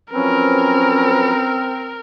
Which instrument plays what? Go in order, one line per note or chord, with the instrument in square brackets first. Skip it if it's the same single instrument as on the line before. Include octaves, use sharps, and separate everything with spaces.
[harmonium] F3 F#3 B4 [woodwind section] C4 [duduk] C#4 [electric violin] A#4